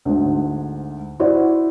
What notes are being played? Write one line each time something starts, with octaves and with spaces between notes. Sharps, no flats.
D2 G#2
E4 F#4 C5 D5